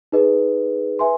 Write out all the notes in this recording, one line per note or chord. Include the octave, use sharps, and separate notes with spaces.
D#4 G#4 B4 D#5
B4 E5 G#5 C6